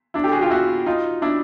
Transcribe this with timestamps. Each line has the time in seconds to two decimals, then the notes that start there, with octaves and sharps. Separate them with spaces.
0.14 D4 E4
0.24 G4 A4
0.32 F#4 G#4
0.41 F4 G4
0.50 E4 F#4
0.86 D#4 F4
1.22 D4 E4